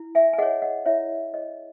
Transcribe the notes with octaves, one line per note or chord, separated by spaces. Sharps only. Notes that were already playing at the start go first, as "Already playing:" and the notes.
Already playing: E4
E5 G#5
G#5
G#4 C#5 D#5 F#5
D#5 F#5
E4 C#5 E5
G#4 C#5 D#5